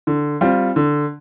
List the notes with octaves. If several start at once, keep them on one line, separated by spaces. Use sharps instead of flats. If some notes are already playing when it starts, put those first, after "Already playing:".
D3
G3 C4 F4
D3